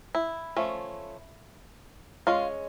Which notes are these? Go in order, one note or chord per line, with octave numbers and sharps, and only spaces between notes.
E4
F3 A3 C#4
G#3 C#4 F4